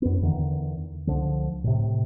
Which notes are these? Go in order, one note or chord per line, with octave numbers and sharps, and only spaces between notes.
F#2 B3
E2 D3 D#3
C#2 D3 F3
A2 C3